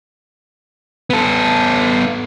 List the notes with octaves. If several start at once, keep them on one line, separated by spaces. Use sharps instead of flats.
B3 A4